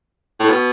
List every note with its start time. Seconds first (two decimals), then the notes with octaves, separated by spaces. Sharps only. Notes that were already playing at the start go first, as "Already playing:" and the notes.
0.40 A2
0.49 B2